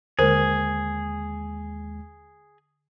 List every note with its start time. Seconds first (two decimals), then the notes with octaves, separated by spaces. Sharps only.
0.19 D#2 D3 G#3 G#4 A#4 C5